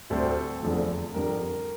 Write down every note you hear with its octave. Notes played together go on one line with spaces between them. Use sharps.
D2 D3 G3 C4 A4
F1 E2 D3 F3 A3
F2 D3 G3 D4 A#4